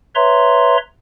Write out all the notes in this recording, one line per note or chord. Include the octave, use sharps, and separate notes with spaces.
B4 C#5 E5 A#5 C6